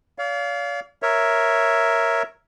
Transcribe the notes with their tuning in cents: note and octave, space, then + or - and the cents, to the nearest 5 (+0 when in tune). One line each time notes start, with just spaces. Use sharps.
D5 -45 F5 +0
A#4 +0 C#5 +0 E5 +0